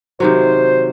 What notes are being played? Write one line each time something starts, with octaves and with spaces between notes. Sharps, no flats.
C3 D#3 F#3 C5